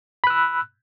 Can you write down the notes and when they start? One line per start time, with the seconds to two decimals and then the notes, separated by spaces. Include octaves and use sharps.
0.24 B5
0.27 F#6
0.30 E6